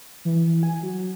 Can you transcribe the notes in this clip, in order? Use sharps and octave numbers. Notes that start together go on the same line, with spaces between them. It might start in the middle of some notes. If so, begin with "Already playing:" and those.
E3
G#5
F#3